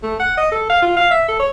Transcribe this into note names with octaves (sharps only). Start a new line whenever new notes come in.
A3
F#5
D#5
A4
F5
F4
F5
E5
A4
C#5